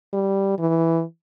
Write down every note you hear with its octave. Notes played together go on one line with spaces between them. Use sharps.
G3
E3